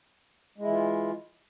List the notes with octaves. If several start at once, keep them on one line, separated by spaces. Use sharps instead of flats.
E3 G#3 E4 F4